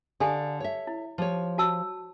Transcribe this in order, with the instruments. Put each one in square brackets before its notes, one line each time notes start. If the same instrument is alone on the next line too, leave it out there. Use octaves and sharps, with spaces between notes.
[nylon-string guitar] D3 D5 F5 [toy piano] G4 A4 G#5
[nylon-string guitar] C#5 E5
[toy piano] E4
[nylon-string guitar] F3 G4 C#5
[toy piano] F#4 A5 E6